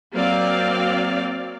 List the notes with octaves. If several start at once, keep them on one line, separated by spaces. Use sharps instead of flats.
F#3 A#3 C4 D5 F5